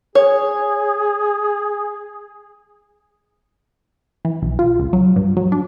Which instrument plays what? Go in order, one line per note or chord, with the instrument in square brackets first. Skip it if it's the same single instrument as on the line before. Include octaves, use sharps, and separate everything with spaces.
[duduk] G#4 [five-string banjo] C#5
[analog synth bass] E3
B1
F4
C#2
F#3
G2
F#3
D4